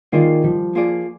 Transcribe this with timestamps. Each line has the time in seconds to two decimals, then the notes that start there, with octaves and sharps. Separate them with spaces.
0.12 D#3 A#3 F4 G#4 D5
0.44 F3 G3
0.75 A#3 F4 G#4 D5